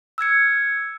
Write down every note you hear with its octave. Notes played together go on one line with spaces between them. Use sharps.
E6 F6 G#6 C#7